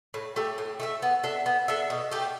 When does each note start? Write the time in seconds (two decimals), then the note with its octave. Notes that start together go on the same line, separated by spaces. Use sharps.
0.14 A2
0.36 A3 G4 E5
0.58 A2
0.80 A3 G4 E5
1.02 B3
1.23 D4 A4 E5
1.46 B3
1.68 D4 A4 E5
1.90 B2
2.11 A3 G4